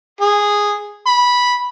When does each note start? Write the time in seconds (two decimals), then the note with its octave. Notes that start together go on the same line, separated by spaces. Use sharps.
0.21 G#4
1.07 B5